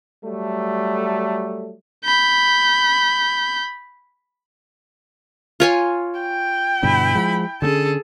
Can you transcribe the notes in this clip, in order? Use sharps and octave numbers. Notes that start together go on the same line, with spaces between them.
F#3 G3 A3
B5 G6
F4 C#5 G#5
G5
G2 B2 D3 E4 B5
F3 G#3
D3 C4 C#4 G#4 A4